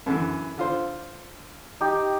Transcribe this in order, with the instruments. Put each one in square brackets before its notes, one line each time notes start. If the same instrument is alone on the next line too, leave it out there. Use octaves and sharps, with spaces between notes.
[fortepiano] F#2 D3 E3
D3 F4 C5
[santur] D#4 G4